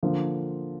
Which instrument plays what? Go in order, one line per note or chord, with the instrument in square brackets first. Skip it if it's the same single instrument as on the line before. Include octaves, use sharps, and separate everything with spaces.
[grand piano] D3 F3 A#3